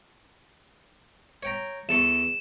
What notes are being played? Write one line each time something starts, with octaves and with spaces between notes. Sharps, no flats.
C#5 G5 A#5
E2 A4 C#6 E7